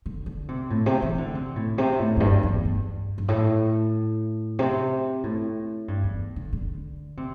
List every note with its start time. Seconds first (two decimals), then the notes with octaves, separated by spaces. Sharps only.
0.06 D3
0.26 D3
0.48 C3
0.70 A2
0.86 C3
1.02 E3
1.18 D3
1.35 C3
1.56 A2
1.78 C3
1.99 A2
2.16 E2
2.20 G2
2.43 E2
2.65 G2
3.18 G2
3.28 A2
4.59 C3
5.23 A2
5.88 G2
6.04 E2
6.36 D3
6.53 D3
7.17 C3